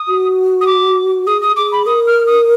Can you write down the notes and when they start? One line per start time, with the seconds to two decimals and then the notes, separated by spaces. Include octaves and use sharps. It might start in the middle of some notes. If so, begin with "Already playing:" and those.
Already playing: D#6
0.08 F#4
0.61 D#6
0.67 D6
1.27 G#4 D#6
1.42 D#6
1.56 G#4 D6
1.72 B5
1.86 A#4 D#6
2.07 F6
2.27 D#6